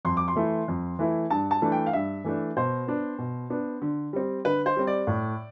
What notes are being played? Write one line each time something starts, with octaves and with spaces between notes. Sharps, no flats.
F2 C6
D6
C6
E3 A3 E4
F2
E3 A3 E4
G2 A5
A5
E3 A3 D4
G5
F5
G2 E5
E3 A3 D4
B2 C5
B3 D4
B2
B3 D4
D3
G3 C4
D3 B4
C5
G3 C4
D5
A2